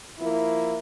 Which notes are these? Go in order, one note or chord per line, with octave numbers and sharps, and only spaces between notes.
F3 A#3 E4